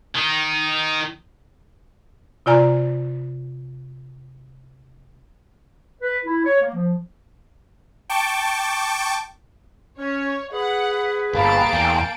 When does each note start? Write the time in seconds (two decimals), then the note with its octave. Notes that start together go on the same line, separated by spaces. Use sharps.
0.16 D#3 D#4
2.46 C3 F4 D5 G#5 A#5
6.01 B4
6.25 E4
6.44 C#5
6.61 A#3
6.74 F3
8.10 G5 A5 C#6 D6
9.98 C#4 C#5
10.52 G#4 B4 F#5
11.33 G1 A#3 A#4 F5 A5 B5 D7
11.73 E2 G5 G#5